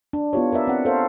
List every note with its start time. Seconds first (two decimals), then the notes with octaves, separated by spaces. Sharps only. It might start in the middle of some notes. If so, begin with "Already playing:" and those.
0.13 D4
0.33 B3 E4 F4 G4 C#5
0.52 A#4 B4 D5 E5
0.68 C4 F#5
0.85 A4 A#4 C5 C#5 F5